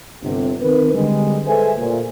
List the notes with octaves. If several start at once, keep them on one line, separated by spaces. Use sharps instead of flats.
G1 C3
D#3 C4 A#4 B4
D3 G3 G#3
G#4 A4 B4 C5 E5 G#5
A#2